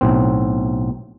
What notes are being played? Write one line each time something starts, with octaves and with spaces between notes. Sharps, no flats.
B1 A2 C4